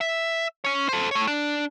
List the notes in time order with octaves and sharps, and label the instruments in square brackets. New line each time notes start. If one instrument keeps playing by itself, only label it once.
[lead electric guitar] E5
C#4 C#5
A4 C5
A3 C#5
D4